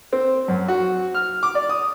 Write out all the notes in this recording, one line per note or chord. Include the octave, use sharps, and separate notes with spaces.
C4
F#2
F#4
F6
D6
D5
D#6